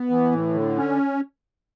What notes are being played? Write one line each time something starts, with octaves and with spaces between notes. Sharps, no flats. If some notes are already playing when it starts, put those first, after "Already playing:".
Already playing: B3
E3
A2
D3
C#4